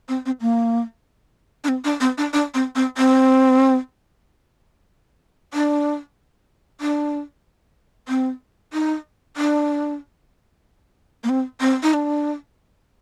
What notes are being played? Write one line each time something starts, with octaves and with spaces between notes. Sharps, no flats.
C4
C4
A#3
D4
C4
D4
C4
D4
D4
C4
C4
C4
D4
D4
C4
D#4
D4
A#3
C4
C4
D#4
D4